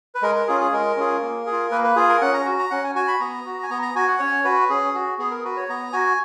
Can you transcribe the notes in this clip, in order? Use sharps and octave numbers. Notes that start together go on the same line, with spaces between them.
B4
G#3 A#4
A#4
C#4 F4 G#4
G#4
G#3 A#4
C#4 F4 G#4
A#3
G#4
F4
A#3 B4
B4
F4 G#4
A#4
C#4 F#5
A#5
F#4
A#5
C#4 F#5
G#5
F#4 G#5
B5
B3 A#5
F#4
G#5
B3 A#5
A#5
F#4 G#5
F#5
C#4 C#5
F#4 B4
C#4 G#4
F#4
B3 G#4
A#4
F#4 B4
C#5
B3 A#5
F#4 G#5